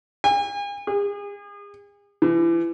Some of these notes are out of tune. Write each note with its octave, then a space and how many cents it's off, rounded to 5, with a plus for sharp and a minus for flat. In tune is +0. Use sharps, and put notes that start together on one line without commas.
G#5 -45
G#4 -40
E3 +30